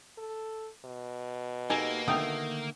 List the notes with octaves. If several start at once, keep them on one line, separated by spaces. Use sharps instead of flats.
A4
B2
A#3 D#4 G4 A4 G#5
D3 D#3 A3 G5 D#6